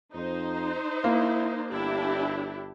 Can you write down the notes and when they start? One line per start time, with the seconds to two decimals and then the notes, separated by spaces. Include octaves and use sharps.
0.14 F2 D#4 C5
1.04 A#3 E4
1.72 G1 D4 E4 G4